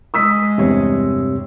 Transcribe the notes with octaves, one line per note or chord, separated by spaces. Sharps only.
G#3 D#6 E6 B6
E2 G2 C3 C#5